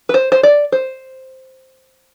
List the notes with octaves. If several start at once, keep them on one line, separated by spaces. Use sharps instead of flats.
B4
C5
C5
D5
C5